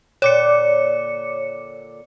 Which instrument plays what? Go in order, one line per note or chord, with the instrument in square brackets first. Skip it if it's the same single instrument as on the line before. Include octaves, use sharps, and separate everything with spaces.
[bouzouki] A#2 D3 G5 [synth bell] C#5 D6 C#7